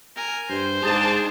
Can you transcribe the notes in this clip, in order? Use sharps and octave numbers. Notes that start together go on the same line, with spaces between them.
A#4 G#5
G2 C5
G#2 D4 G#4 A5